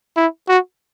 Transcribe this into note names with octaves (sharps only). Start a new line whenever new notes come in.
E4
F#4